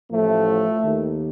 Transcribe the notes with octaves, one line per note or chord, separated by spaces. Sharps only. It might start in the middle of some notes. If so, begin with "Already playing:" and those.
A1 A2 F3 A3
D#2 D#3